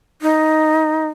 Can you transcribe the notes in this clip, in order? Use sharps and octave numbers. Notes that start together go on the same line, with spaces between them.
D#4